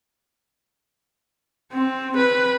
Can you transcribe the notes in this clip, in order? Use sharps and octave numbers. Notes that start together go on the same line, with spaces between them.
C4
B4